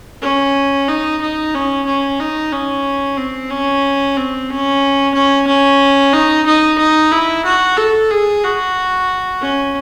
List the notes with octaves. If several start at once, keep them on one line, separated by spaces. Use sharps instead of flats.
C#4
D#4
D#4
C#4
C#4
D#4
C#4
C4
C#4
C4
C#4
C#4
C#4
D#4
D#4
D#4
E4
F#4
A4
G#4
F#4
C#4